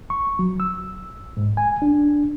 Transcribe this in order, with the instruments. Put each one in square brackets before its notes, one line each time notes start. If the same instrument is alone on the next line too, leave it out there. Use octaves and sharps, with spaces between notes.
[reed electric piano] C#6
F#3
E6
G#2
G#5
D4